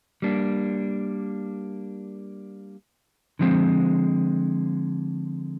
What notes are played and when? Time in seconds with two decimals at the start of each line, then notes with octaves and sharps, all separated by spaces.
0.22 G3 A#3 D4
3.39 D3 F3 G#3 C4